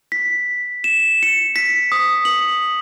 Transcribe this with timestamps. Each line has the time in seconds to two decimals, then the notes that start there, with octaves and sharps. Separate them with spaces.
0.12 B6
0.84 E7
1.23 C#7
1.56 B6
1.92 D#6
2.25 F#7